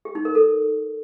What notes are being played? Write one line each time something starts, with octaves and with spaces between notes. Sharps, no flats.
G4
D#4
A#4
A4